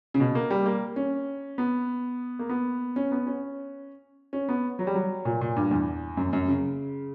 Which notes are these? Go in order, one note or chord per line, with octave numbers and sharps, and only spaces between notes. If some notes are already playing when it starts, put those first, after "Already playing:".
C#3
B2
A#3
G3
A#3
C#4
B3
A#3
B3
C#4
B3
C#4
C#4
B3
F#3
G3
F#3
A#2
A#2
G2
E2
F#2
F#2
C#3